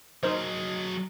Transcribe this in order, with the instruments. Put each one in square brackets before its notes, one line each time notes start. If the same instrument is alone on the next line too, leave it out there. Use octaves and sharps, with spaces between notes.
[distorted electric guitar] F#3 G#4 [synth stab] D#4 A#4 C5 [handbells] D#5